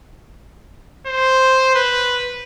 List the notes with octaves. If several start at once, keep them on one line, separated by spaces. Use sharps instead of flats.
C5
B4